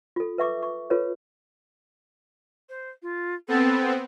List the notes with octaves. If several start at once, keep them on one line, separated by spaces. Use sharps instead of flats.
F4 A4
B4 E5 C#6 D6
C#6
F4 A4 B4 C#5
C5
F4
B3 C4 A4